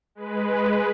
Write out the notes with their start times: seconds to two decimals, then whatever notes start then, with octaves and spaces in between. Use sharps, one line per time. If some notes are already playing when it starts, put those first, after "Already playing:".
0.15 G#3 B4